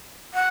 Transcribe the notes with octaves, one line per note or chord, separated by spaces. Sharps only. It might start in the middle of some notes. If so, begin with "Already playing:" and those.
F#5